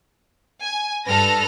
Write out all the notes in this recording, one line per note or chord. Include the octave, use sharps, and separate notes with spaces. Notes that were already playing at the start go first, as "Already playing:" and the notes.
G#5
G2 A4 B4 F6 A#6